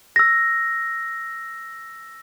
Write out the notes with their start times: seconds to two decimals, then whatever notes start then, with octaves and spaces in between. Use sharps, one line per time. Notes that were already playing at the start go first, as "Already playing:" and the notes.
0.16 E6 A#6